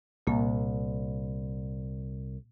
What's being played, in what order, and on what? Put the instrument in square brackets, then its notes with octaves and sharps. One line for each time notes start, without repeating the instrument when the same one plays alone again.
[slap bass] C2 [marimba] A#2 A#3